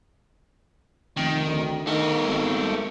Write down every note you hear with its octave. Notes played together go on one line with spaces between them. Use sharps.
F1 D#3
D2
D#3 A3 A#4
G#1